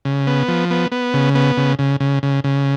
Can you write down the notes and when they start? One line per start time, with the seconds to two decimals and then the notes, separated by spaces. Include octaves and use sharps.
0.05 C#3
0.27 B3
0.48 F3
0.71 B3
0.92 B3
1.14 C#3
1.35 B3
1.57 C#3
1.79 C#3
2.00 C#3
2.23 C#3
2.44 C#3